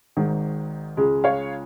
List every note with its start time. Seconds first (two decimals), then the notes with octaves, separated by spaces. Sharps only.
0.17 G#1 G#2 D#3
0.97 C#2 C#3 G#3
1.24 C#5 F5